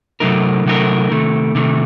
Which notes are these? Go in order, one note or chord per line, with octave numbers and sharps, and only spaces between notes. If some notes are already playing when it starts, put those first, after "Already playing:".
C3 F#3 A3 D#4 A#4
C3 F#3 A3 D#4 A#4
C3 D#3 A3
C3 D#3 A3